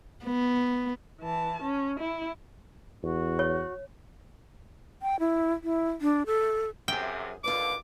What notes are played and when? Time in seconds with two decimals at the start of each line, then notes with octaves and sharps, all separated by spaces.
0.25 B3
1.21 E3 A5
1.62 C#4
1.99 E4
3.03 E2 F#4
3.39 C#5
5.02 G5
5.20 E4
5.63 E4
6.01 D4
6.26 A4
6.88 F#2 C3 G#4 E5 G5
7.44 D#2 D3 F4 B4 D5 D6